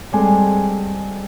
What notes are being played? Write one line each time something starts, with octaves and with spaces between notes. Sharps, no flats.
G3 G#3 C4 G#4 A4 G#5